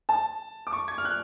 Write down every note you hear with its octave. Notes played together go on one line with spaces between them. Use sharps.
A5
D6
C#6
G#6
F6
F#6